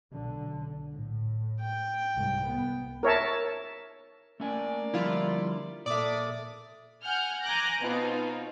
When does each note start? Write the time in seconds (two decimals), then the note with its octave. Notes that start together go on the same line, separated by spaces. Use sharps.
0.11 B1 D3
0.93 A2
1.61 G5
2.16 C2 G#2
2.45 B3
3.03 A#4 C#5 E5 A5
4.40 A3 A#3 C#4 D5 G#5
4.94 D3 F3 G3 E4 F4
5.86 A#2 A4 D5 E5 D6 D#6
7.04 F#5 G#5 F6 G6
7.42 G#5 A#5 D6 F#6 G6 A#6
7.80 B2 C4 D#4 F4